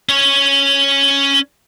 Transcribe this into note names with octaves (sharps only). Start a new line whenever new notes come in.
C#4 C#5